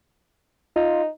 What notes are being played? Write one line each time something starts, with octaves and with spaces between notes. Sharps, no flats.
D#4 F4